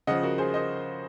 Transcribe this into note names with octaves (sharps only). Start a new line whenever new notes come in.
C#3 F3 D#5 F#5
F#4 A#4
G#4 C5
C5 D#5